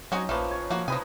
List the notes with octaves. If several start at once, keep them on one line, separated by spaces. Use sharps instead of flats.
F#3 C4 C#4 D#4 F#4 D#5 G#5
A#1 F3 A3 A#3 B4 F5
C#5
F3 A#3 F#4
C3 F3 D#4 B4 D#5 G#5